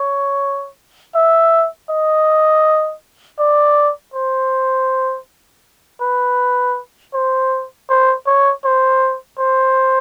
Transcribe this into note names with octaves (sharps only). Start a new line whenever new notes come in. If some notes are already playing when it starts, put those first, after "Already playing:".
Already playing: C#5
E5
D#5
D5
C5
B4
C5
C5
C#5
C5
C5